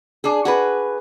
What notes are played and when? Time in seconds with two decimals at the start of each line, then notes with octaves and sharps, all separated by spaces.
0.24 D4 G#4
0.45 F#4 G#4 B4